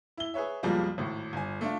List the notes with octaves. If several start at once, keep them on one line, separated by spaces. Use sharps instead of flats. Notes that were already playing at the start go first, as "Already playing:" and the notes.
E4 G7
G#4 B4 C#5 E5
B1 F2 F3 G3 G#3 A#3
G#1 A2
G1 G#5
A3 D4 F4